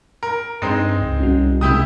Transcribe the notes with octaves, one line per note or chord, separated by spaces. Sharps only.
A#4
G2 G#3 C4 D#4
C#2
C2 C#4 F#4
C3 G#3 E4 G4 D#6